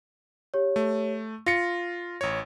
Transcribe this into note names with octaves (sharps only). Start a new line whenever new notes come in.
G4 C#5
A3
F4 A#6 C#7
A1 C#5